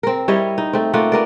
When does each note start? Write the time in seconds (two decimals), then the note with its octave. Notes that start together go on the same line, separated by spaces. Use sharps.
0.03 C4 A#4
0.28 G3 E4 C#5 D#5
0.58 D#4
0.73 A3 C4
0.93 A3 A#3 F4 F#5
1.12 B3 A#4 D5